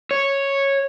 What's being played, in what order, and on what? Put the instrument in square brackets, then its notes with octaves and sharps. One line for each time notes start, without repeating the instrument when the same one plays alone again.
[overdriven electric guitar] C#5